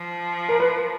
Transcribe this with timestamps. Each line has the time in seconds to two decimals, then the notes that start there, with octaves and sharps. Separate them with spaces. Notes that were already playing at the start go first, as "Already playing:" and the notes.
Already playing: F3
0.49 A#4
0.60 B4